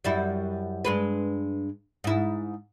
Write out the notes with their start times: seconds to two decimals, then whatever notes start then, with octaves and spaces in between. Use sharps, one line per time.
0.04 F#2 G3 E4
0.85 G2 G#3 B4
2.04 G#2 E4